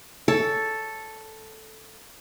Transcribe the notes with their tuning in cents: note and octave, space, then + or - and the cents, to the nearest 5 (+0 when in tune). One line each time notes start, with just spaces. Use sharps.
A4 +0 C#5 +15